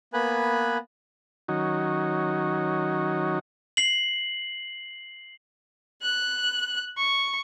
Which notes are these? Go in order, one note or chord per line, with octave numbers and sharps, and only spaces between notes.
A#3 B3 B4 G#5 B5 F#6
D#3 F#3 C#4 D#4 F#4
C7 F#7
F#6
C#6